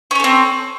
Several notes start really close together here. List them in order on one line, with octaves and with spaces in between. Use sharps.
C#4 C#5 A4 C4